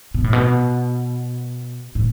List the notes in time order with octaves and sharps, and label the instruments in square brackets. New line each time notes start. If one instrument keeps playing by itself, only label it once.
[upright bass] B2
A2
B2
A2